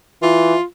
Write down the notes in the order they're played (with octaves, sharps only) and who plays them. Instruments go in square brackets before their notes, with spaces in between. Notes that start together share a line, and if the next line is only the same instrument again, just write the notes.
[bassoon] E3 [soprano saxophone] F4